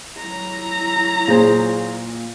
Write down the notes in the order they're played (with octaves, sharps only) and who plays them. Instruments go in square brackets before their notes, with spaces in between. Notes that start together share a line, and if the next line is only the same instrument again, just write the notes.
[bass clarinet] F#3 [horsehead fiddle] E4 A#5
[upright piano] A#2 [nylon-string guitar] G#4 C5